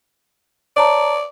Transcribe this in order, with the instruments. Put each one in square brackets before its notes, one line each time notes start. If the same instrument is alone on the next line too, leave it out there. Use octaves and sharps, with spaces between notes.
[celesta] C#5 A5 A#5 [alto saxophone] D5